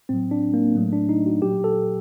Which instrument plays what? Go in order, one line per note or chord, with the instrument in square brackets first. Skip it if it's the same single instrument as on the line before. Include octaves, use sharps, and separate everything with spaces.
[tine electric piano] A2 F#3 C4
D4
A#3
A2 F#3 A3
D4
D#4
F#4
A#2 F#3 G4
A4